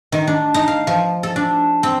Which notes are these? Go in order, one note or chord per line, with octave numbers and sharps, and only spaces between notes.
D#3
D4
D#4
F5
F3
A4
D4
C4